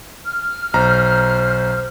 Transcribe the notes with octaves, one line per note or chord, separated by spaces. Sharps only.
F6
B1 C5 A#5